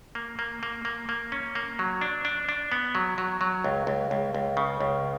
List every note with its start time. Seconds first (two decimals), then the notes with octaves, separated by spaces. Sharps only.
0.15 A#3
0.39 A#3
0.63 A#3
0.85 A#3
1.09 A#3
1.32 C#4
1.55 A#3
1.79 F#3
2.01 D4
2.25 D4
2.49 D4
2.72 B3
2.95 F#3
3.18 F#3
3.41 F#3
3.64 C#2
3.87 C#2
4.11 C#2
4.35 C#2
4.57 C#3
4.80 C#2